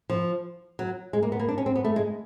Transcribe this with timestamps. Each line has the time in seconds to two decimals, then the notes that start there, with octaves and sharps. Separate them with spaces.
0.10 F3
0.79 F#3
1.13 G#3
1.23 A#3
1.32 B3
1.40 A#3
1.49 D4
1.58 C#4
1.66 C4
1.76 B3
1.84 A3
1.96 G#3